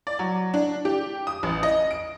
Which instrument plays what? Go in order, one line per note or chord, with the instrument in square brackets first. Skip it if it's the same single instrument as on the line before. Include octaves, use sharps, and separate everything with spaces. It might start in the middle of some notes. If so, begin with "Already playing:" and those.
[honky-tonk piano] D5
F#3
D4
G4
D#6
A1
D#5
D7